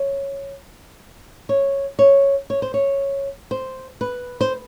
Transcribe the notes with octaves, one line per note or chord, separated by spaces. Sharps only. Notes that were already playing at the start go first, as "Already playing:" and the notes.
Already playing: C#5
C#5
C#5
C#5
C5
C#5
C5
B4
C5